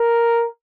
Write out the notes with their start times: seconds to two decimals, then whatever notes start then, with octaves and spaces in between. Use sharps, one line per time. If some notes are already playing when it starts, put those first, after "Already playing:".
Already playing: A#4